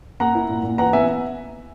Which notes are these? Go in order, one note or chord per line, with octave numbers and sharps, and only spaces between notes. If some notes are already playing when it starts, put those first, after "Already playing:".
A#3 F#5 A#5
E4
A#2
A#2
E3 F#5 A#5
B3 E5 G#5